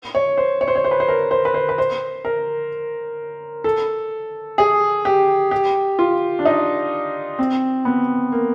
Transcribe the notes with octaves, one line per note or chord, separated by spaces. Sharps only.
C#5
C5
C#5
C5
C#5
C5
B4
C5
A#4
C5
B4
C5
B4
C5
A#4
A4
G#4
G4
G4
F4
D4
D#4
C4
B3
A#3